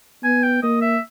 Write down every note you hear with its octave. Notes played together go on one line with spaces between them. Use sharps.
B3 G#5
G5
A#3 D#5
E5